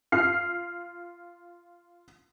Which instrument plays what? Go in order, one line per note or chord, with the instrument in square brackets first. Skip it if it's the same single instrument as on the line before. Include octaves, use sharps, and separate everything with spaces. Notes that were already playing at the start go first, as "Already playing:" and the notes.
[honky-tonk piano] F4 F6 C7